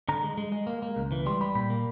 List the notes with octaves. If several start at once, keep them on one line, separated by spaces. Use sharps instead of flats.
D3 A#5
G#3
G#3
G#3
A#3
A#3
C#2
E3
G3 C6
G3 B5
A#2 B5
A#3